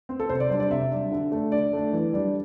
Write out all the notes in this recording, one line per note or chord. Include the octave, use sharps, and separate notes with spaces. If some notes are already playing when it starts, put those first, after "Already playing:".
C4
A4
C3 C5
D5
G3 D4 C5
D5
C3 E5
G3 D4
D3
A3 D4
D3 D5
A3 D4
E3
G3 D4